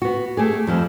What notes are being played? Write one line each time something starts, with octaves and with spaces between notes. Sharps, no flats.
B3 F#4
A3 G4 G#4
F2 F3 G3